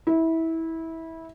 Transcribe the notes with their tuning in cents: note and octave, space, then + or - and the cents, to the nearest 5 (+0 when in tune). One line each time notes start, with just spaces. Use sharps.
E4 -20